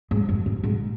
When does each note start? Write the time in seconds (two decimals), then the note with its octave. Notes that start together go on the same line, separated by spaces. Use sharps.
0.11 G#2
0.29 F#2
0.46 G#2
0.63 G#2